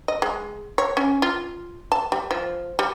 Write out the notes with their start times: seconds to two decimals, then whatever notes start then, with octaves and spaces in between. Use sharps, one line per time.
0.08 D#5
0.22 G#3
0.78 C#5
0.97 C#4
1.22 F4
1.92 A5
2.12 G3
2.31 F3
2.79 G3